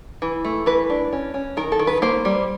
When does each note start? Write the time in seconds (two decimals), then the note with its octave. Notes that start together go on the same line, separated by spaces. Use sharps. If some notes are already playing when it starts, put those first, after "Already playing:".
0.22 E3
0.45 A3
0.66 E3 B4
0.90 D4
1.13 C#4
1.34 C#4
1.57 D#3 A#4
1.72 A4
1.79 D#3
1.87 B4
2.02 A#3 C5
2.25 G3